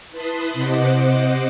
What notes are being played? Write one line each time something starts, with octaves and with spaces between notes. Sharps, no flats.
E4 B4 A5 B5 C6 D#6
C3 C5 D#5 F#5 D6